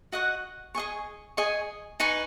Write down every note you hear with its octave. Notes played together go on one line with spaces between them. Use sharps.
F#4 D#5 F#5 C#6
G#4 D#5 G#5 C#6
G#4 D#5 G#5 C#6
D#4 B4 G#5 C#6